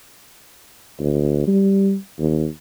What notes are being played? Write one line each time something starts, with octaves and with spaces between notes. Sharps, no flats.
D2
G3
D#2